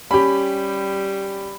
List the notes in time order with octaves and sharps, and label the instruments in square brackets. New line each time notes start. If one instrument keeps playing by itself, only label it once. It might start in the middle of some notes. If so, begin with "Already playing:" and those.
[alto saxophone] G3 [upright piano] C#4 G4 [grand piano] B5